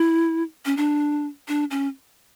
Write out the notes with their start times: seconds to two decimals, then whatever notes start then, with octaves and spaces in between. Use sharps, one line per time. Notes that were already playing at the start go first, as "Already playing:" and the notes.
Already playing: E4
0.66 C#4
0.77 D4
1.48 D4
1.71 C#4